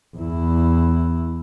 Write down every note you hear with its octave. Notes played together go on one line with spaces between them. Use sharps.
E2 E4